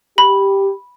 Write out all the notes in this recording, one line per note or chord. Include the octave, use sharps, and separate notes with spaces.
G4 B5